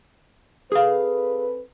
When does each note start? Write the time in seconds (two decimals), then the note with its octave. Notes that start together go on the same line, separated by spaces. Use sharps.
0.72 C4 G#4 A4 B4 F5